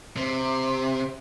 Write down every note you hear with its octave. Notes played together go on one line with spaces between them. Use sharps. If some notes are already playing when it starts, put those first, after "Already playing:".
C3